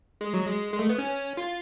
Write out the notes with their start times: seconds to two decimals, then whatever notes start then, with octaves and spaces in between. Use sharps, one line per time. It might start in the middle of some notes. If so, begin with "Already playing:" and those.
0.21 G#3
0.34 F#3
0.46 G#3
0.74 G#3
0.79 A3
0.89 B3
0.98 C#4
1.37 F4